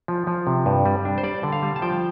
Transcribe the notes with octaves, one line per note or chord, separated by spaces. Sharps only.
F3
F3
C3
G2
G3
D4
C5
G3 D5
D3
F5
G3
A5
F3 G5